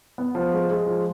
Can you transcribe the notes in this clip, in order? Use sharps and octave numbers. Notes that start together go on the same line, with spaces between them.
B3
F3
G#3
G#3
F3